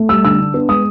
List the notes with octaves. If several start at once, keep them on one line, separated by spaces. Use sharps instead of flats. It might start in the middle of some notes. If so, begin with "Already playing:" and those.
Already playing: A3
G3 E6
D3 E6
D4
B3
G#3 D#6